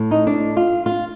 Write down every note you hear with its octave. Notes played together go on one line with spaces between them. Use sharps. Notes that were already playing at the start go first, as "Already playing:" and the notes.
Already playing: A2
D#4
D4
F4
F4